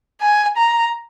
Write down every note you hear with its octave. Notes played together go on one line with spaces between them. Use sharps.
G#5
A#5